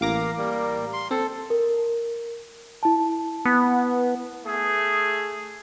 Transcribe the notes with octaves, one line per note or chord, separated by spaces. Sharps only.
A1 A#3 F5 D6 A#6
G3 A#3
C6
C4 A4
A#4
E4 A5
B3
A3 G#4